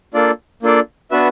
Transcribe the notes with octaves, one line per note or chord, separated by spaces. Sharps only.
A#3 D4 F4 A4 D5
A#3 D4 F4 A4 D5
B3 D4 F#4 B4 E5